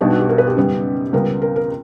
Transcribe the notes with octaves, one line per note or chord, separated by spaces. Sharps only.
B1 B2 G3 B3 D4 G4
F#4
G4
A#4
B4
G4
F#2 C#3 G3 B3
C#2 C#3 G3 B3 A#4
A#4
A#4